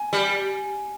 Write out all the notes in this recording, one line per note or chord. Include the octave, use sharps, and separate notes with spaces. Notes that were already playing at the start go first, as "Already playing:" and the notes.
Already playing: G#5
G3